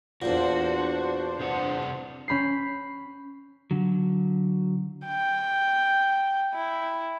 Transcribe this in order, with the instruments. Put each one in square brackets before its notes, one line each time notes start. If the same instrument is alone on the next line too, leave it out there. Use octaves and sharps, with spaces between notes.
[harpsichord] E2 A#2 [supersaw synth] D4 C5 [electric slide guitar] F#4
[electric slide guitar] C3 G#4 F#5
[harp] C#4 B5 G6 C7
[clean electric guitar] D3 F#3
[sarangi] G5
E4